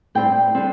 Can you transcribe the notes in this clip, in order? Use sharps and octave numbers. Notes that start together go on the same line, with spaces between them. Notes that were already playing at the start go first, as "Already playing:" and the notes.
A2 G3 C4 G5
D3 G3 C4